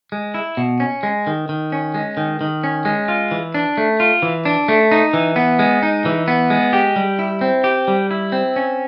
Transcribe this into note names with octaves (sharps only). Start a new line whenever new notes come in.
G#3
E4
B2
C#4
G#3
D#3
D#3
C#4
G#3
D#3
D#3
C#4
G#3
F4
E3
D4
A3
F4
E3
D4
A3
D#4
E3
B3
G#3
D#4
E3
B3
G#3
G4
G3
E4
C4
G4
G3
E4
C4
C#4